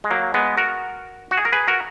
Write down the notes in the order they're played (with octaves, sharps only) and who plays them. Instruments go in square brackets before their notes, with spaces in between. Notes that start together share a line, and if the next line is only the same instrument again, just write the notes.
[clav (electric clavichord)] G#3
F#3 A#3
G#3 B3
F#4 A#4
F#4
G#4
A#4
G#4 B4
F#4 A#4